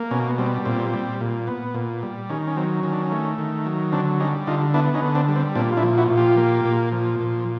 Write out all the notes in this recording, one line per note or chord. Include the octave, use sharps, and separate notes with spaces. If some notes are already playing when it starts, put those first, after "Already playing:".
Already playing: A#3
B2 C#4
G3 C4
A#2 C4
G3
A#2
B3
A#2
G3
D#3 C#4
C#4
F#3 C4
D#3 C#4
D4
C#4
A3
D#3
F#3
D3 C4 D4
G3 C#4 D#4
D3 D#4 F4
B3 D4 E4
C#4 D#4
D3
C4 D4
G3
C4
A#2 C4 D4
F4
D4 E4
F3
E4 F#4
A#2
F4 G4
A#3
A#2
F3
A#2